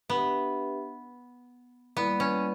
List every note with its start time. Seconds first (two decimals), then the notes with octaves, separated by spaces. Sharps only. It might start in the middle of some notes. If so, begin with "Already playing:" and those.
0.10 B3 D4 G4 B4 E5
1.97 G3 A#3 B3 E4 B4 D5
2.20 C#4